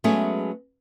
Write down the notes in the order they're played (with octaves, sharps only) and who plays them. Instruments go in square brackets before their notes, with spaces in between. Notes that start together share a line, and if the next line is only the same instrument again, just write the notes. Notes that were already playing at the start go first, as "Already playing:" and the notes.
[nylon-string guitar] F#3 G#3 A3 B3 C#4 G#4